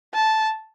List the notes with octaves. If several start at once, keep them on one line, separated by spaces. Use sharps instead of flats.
A5